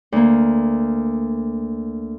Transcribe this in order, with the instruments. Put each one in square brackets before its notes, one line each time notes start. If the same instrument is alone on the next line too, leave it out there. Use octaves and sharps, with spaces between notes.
[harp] D2 A#3